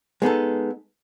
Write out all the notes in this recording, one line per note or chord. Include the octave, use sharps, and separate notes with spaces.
G#3 B3 D#4 A4